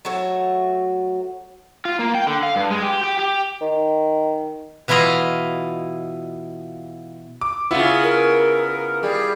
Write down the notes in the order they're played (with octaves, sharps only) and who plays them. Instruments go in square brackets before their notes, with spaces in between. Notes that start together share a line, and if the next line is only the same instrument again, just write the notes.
[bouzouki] F#3 A3 F#4 C#5
[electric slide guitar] F4
A#3
G5
D3
F5
G2
G#3
G4
G4
G4
[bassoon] D#3
[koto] B2 E3 E4 F4 D#5 F5
[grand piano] D6
[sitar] C#3 B3 [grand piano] E4 F4
[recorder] A#4
[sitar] G3 [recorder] G#4